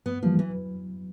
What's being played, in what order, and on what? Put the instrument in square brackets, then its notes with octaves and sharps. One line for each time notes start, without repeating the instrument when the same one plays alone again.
[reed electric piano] G2 [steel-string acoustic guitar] B3
[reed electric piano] E3 G3 A#3 [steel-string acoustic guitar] F3
[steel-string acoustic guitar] E3 [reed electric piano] F#3